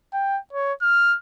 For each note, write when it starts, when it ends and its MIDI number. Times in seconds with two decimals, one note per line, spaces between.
0.13 0.39 79
0.53 0.73 73
0.82 1.17 89